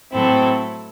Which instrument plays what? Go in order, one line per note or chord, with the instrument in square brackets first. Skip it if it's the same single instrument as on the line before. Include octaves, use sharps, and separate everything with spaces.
[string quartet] A2 F#3 A3 E4 A4 [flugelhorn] C4